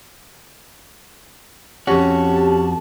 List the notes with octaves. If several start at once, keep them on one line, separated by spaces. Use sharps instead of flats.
F2 C#4 F#4 G4 A5